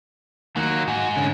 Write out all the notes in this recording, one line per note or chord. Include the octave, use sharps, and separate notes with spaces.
D#3 F#3 A#3
G#2 F#4
D3 C#4